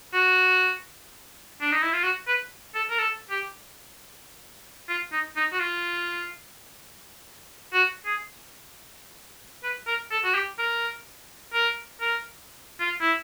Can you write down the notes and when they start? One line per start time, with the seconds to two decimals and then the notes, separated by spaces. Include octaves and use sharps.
0.14 F#4
1.61 D4
1.72 D#4
1.83 E4
1.93 F4
2.04 F#4
2.28 B4
2.75 A4
2.90 A#4
2.99 A4
3.30 G4
4.89 F4
5.13 D#4
5.36 D#4
5.53 F#4
5.60 F4
7.73 F#4
8.06 G#4
9.64 B4
9.87 A#4
10.11 A4
10.24 F#4
10.35 G4
10.59 A#4
11.54 A#4
12.01 A#4
12.80 F4
13.01 E4